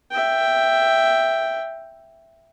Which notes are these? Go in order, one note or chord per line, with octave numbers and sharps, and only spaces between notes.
E5 G5